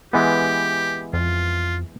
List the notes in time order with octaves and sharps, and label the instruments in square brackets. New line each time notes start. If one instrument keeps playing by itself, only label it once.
[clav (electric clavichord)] E3 G#3 B3 [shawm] G4
[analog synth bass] F2 [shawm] F4